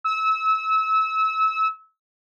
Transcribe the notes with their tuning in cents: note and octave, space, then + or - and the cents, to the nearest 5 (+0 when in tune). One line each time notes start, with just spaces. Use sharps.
E6 -30